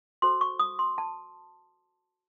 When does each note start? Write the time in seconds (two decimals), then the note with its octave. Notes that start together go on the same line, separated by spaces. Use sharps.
0.22 F#4 A4 C5 C6
0.41 C#6
0.59 D#6
0.79 C6
0.98 A5